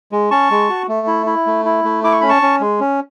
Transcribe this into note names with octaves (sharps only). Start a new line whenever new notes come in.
G#3
C#4 A5 C#6
G#3
F#4
A3
E4
E4
A3
E4
A3
E4 D6
C#6
C#4 B5
A5 C#6
C#4
G#3
C#4